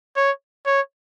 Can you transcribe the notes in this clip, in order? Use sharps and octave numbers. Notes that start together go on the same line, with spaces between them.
C#5
C#5